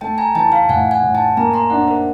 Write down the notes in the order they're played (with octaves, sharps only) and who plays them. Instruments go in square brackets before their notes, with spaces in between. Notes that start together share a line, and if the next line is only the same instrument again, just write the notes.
[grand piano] A3 [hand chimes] G5 A5
[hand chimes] G#5 A#5
[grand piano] E3 [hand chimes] G5 A5
[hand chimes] F5 G5
[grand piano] A2 [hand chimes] F#5 G#5
[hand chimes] F#5 G#5
[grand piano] A2
[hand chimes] G5 A5
[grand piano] A#3 [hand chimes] G#5 A#5
[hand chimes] A#5 C6
[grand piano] D4 [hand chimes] E5 F#5
[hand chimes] A#4 C5